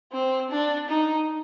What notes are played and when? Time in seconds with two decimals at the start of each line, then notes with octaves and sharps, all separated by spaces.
0.12 C4
0.50 D4
0.88 D#4